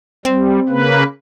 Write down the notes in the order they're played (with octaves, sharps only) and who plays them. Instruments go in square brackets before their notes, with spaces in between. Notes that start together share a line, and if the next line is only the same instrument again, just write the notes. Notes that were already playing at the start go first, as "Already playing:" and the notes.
[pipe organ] G3 [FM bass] C4
[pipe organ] C#3 A#3 B4